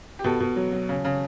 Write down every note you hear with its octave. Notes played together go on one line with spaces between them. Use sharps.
G4
B2 A4
B2
F#3
F#3
C#3
C#3